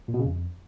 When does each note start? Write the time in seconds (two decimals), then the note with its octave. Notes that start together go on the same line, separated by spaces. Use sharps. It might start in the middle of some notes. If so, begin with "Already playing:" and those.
0.08 A#2
0.14 B2
0.19 C#3
0.25 F2